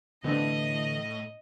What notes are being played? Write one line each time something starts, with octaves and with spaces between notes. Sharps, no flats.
A2 D3 E3 B3 C4 D4 D#5